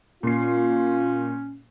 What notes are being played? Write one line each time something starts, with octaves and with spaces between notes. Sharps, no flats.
A#2 C#4 F4 C7